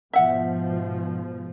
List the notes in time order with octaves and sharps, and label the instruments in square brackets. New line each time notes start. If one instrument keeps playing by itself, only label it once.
[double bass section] G#2 B2 F3 [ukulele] E5 F#5